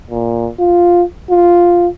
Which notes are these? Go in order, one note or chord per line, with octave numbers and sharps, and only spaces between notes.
A#2
F4
F4